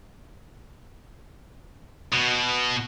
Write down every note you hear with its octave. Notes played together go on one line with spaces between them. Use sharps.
B2